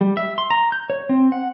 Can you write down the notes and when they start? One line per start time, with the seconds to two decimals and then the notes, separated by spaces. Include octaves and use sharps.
0.01 G3
0.17 E5
0.38 C6
0.50 A#5
0.72 G6
0.90 C#5
1.09 C4
1.32 F#5